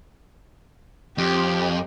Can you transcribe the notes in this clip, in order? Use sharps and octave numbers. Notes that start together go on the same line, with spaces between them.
F2 G4